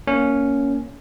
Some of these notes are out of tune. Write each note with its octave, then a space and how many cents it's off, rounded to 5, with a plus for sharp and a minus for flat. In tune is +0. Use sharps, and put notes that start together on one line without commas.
A#3 +0 C#4 +10